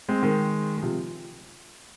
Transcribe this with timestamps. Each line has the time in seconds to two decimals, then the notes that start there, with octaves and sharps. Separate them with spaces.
0.09 G#3 C4
0.23 D#3 G#3
0.77 G#3
0.83 C3 F3